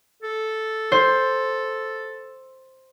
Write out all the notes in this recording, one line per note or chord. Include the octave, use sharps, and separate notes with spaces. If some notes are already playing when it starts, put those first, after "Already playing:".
A4
C5